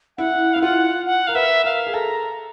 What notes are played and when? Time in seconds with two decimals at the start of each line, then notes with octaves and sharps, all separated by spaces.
0.18 E4 F#5
0.54 E4 F5
0.62 F4 F#5
1.07 F#5
1.27 A#4 F5
1.35 B4 E5
1.64 A#4 F5
1.87 G#4
1.94 A4 A#5